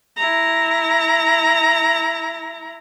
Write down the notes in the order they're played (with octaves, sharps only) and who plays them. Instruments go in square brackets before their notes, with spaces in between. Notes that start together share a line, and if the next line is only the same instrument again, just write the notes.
[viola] E4 A#5